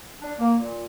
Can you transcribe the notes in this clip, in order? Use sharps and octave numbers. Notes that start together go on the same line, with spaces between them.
D4
A#3
A#2